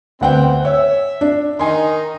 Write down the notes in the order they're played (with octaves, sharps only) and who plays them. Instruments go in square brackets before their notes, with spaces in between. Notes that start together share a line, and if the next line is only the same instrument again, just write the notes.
[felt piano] D2 F#5 G5 [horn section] G3 B3 C4
[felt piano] C#5 [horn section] E5
[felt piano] D4
[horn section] D#3 D#4 [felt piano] G#5 C6